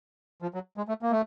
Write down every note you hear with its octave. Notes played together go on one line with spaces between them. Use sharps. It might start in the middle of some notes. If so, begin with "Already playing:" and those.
F3
F#3
G#3
A3
A#3
A3